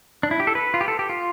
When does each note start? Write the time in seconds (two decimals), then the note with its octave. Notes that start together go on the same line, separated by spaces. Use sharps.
0.23 D4
0.31 E4
0.40 G4
0.47 A4
0.55 B4
0.74 F4
0.81 G4
0.88 A4
0.99 G4
1.09 F4